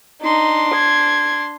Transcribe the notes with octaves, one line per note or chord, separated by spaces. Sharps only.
D4 D#4 C6
G#6